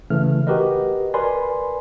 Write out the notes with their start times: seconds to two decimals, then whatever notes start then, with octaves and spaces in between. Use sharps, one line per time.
0.10 C#3 E3 A3 F6
0.47 F#4 G4 A#4 B4 D#5
1.14 A#4 B4 D5 G#5 B5 C6